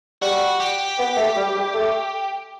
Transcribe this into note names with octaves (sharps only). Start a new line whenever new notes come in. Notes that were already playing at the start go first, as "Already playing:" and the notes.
G3 F#4
G4
B3
A3
G3
G3
A3